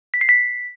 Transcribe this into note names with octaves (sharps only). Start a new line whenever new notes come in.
B6
C7
B6